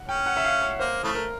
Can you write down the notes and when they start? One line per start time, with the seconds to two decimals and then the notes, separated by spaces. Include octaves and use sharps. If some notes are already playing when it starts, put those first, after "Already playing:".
Already playing: F#5
0.08 C#4 G5
0.26 F#5
0.37 E5
0.45 F5
0.62 C#5
0.79 A#3 C5
1.03 C#3 E3 A3
1.15 A#4